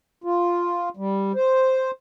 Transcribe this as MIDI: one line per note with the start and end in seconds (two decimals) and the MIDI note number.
0.24 0.89 65
0.97 1.32 55
1.35 1.91 72